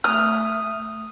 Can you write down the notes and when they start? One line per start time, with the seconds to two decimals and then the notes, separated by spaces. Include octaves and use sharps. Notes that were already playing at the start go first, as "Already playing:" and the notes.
0.04 A3 D#6 F6